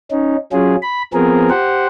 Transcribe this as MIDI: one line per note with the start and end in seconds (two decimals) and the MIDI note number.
0.11 0.37 61
0.11 0.37 63
0.52 0.76 54
0.52 0.76 61
0.52 0.76 65
0.52 0.76 68
0.82 1.02 83
1.13 1.50 53
1.13 1.50 59
1.13 1.50 60
1.13 1.50 68
1.13 1.50 70
1.50 1.87 67
1.50 1.87 72
1.50 1.87 78